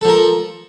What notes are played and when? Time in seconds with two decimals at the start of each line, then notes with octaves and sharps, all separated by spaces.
0.01 A4
0.05 F3
0.08 A#4